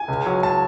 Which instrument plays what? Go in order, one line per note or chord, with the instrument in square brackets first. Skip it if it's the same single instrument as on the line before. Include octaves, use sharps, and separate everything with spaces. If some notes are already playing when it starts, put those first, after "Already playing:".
Already playing: [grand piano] G#5
C#2
F#3
A5